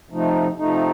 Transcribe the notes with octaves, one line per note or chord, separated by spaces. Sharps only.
C3 F3 A3 D#4
C3 F3 A3 D#4